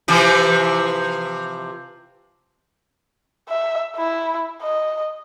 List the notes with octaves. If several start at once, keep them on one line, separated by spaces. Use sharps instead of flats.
C3 E3 F3
E5
E4
D#5